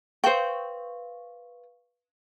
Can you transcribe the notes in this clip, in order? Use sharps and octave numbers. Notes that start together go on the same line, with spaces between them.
B4 C5 F5 G5 C#6